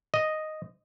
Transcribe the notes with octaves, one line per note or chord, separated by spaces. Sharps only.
D#5